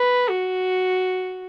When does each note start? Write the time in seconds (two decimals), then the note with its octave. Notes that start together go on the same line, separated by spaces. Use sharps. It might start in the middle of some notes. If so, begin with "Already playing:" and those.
Already playing: B4
0.29 F#4